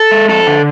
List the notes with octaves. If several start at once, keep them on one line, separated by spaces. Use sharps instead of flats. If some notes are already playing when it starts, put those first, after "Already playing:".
Already playing: A4
G#3
F2 A4
D3